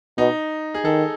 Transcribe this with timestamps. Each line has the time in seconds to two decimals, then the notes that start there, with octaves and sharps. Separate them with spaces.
0.18 B2 D#4
0.74 G#4
0.84 D#3 A4